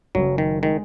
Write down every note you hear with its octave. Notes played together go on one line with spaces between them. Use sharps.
F#1 F#2 C#3 F#3
D#3
D#3 G#3 D#4